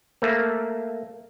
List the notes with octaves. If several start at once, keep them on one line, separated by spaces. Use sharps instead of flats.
A3 A#3